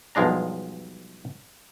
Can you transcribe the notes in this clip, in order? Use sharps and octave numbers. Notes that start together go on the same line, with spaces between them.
B1 G2 F3 G#3 D4 A#5